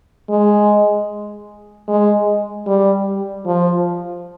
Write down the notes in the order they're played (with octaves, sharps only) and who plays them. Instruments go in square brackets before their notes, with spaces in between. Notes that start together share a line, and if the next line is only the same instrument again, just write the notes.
[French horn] G#3
G#3
G3
F3